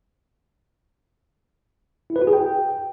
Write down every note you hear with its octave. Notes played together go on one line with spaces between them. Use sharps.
E4
B4
F#4
G#4
G5